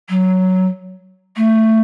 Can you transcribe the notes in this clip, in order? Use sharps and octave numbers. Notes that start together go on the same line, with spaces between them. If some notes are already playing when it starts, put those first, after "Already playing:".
F#3
A3